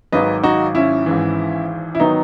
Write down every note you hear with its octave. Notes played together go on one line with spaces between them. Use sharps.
G#1 G#2 D#3 F#3 B4 D#5
D#4 F#4
C#4 E4
G#1 G#2 E3
E4
D#3 F#3 B3 D#4